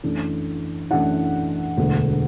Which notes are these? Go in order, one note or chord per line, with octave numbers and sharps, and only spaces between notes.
F#2 E3 A3 D4
F#2 E3 A3 D4 F#5
E1 D2 D3